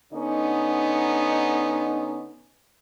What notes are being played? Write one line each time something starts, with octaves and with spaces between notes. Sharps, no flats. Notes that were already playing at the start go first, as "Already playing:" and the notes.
D3 B3 C#4 D#4